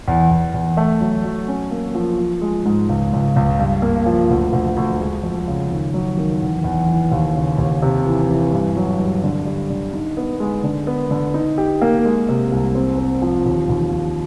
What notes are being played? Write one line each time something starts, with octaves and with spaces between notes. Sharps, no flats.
E2
E2
E2
A3
F#3
F#3
C#4
A#3
F3
F3
G#3
G#2
C#2
C#2
C#2
G2
A#3
F3
D2
D2
D2
G#3
F2
C#3
D#3
F#3
D#3
E2
E2
E3
D#2
C#3
D#2
C3
E3
E3
G2
F#3
G2
D3
G3
D3
D#4
B3
G#3
D3
B3
D3
D#4
G4
A#3
G#3
C3
C2
C4
C4
F3
D#2
D#2
D#2